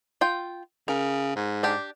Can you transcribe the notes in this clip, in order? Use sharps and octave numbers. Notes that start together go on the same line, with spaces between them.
F4 G5
C#3 A#4
G#2
D4 G4